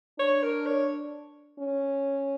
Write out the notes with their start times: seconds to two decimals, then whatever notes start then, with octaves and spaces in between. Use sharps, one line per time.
0.19 D4 C#5
0.43 A#4
0.66 C#5
1.59 C#4